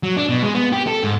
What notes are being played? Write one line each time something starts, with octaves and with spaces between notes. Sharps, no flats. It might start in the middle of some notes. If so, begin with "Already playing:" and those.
F#3
D4
B2
G#3
B3
G4
A4
G#2